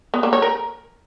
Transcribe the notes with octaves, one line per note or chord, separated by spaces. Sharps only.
B3
A#3
C#5
A#4